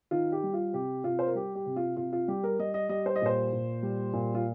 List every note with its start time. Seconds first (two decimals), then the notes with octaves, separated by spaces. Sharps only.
0.11 D#3 F4
0.32 G4
0.43 G3
0.53 F4
0.73 C3 G4
1.04 C3 F4
1.19 C5
1.27 A#4
1.35 G3 G4
1.55 G4
1.66 C3
1.76 F4
1.97 C3 F4
2.13 F4
2.28 G3 G4
2.44 A#4
2.59 G3 D#5
2.74 D#5
2.89 G3 D#5
3.06 C5
3.16 D#5
3.21 A#2 C5
3.52 A#2
3.83 G3
4.13 A#2
4.35 F4